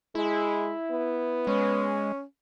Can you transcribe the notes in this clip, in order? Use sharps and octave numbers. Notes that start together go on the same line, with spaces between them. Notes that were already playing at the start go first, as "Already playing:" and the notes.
G#3 E4
B3
G#3 C#4